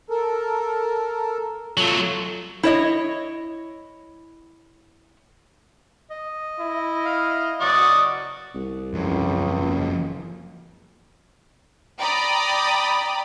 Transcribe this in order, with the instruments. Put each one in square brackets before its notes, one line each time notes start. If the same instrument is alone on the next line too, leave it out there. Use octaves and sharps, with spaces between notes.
[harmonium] A4 A#4
[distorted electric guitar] F#3 A3 [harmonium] F4 A4
[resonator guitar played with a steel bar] E4 C#5 D#5
[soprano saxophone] D#5
[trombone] E4
[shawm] F5
[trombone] F#3 [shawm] D5 [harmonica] F#5 C#6 D#6
[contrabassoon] C2
[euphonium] C#2 [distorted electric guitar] F#2 F3
[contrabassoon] F#1
[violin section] D5 G5 A#5 B5 D#6